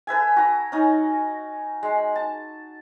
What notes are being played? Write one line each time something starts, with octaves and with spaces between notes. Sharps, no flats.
A4 B4 E5 G#5
F#4 A#5
C#4 D#4
G#3
A5